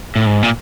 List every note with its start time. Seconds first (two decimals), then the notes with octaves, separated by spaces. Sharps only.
0.16 A2
0.26 G#2
0.43 A#2